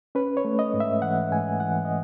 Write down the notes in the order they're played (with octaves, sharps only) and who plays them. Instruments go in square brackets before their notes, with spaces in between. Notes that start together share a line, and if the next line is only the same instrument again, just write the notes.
[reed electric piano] C#4 B4
C#5
A3
D#5
G#2
E5
E3 F#5
G#2 G#5
E3 F#5
D#5